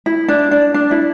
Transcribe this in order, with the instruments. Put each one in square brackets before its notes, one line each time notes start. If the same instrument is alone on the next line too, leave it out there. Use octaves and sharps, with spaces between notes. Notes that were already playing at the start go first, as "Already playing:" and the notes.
[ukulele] E4
D4
D4
D4
E4